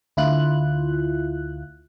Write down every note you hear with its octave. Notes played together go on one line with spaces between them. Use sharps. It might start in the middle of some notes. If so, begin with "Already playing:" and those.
D2 E4 F4 F#6